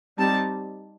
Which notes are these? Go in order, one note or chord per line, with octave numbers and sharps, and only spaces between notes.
G3 C4 D#4 A5